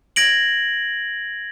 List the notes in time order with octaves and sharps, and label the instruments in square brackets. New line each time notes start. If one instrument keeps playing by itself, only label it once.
[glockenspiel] G#6 A#6 D7 F#7